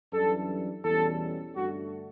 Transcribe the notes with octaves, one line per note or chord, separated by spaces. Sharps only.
F#2 E3 G3 D4 A4
E2 B2 G3 C#4 A4
G2 D3 A3 F#4